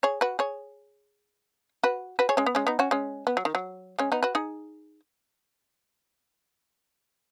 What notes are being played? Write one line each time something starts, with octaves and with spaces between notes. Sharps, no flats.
G#4 C#5
F#4 B4
G#4 C#5
F#4 B4
F#4 B4
G#4 C#5
G#3 C#4
B3
G#3 C#4
B3 D#4
C#4 F#4
G#3 C#4
B3
F#3
D#3
F#3
G#3 C#4
B3 D#4
F#4 B4
D#4 G#4